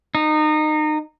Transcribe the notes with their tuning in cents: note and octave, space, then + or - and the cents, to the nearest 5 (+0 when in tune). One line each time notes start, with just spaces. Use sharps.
D#4 -25